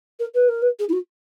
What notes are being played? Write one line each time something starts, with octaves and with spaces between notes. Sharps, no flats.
A#4
B4
A#4
B4
G#4
E4
F#4